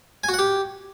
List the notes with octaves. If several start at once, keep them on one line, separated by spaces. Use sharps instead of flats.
G#5
F#4
F#5
G4